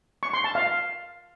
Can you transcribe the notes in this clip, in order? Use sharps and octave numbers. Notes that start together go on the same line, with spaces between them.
C#6
C6
A5
F5